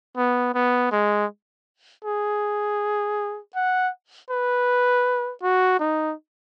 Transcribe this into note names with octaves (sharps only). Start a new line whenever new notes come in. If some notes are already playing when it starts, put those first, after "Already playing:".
B3
B3
G#3
G#4
F#5
B4
F#4
D#4